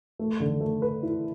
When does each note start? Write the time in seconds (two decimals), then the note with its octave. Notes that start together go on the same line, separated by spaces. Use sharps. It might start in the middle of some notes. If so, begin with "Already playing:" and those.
0.19 A3
0.40 D3
0.61 A3
0.82 B4
1.03 E4